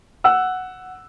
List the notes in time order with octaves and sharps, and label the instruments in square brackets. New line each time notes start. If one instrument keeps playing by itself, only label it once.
[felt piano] F#5 E6